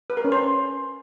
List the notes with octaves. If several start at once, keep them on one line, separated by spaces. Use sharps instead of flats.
B4
A#4
C#4
C5